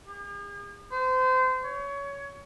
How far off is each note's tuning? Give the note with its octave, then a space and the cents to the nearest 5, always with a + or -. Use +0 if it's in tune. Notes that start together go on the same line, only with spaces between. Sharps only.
G#4 -45
C5 -30
C#5 +20